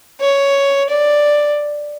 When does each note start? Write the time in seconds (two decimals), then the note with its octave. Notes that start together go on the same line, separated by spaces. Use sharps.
0.21 C#5
0.89 D5